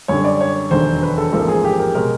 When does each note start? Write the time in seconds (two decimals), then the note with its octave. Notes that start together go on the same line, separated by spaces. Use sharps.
0.08 F#2 D3 G3 C#5
0.25 D5
0.41 C#5
0.70 E1 D#2 D3 F#3 C5
1.03 B4
1.18 A4
1.32 A1 G#2 F3 A#3 A4
1.48 G#4
1.64 G4
1.79 A#4
1.95 B2 G#3 A#4